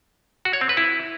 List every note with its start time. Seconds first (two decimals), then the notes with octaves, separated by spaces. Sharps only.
0.45 F#4
0.53 C#5
0.61 C4
0.69 B4
0.77 E4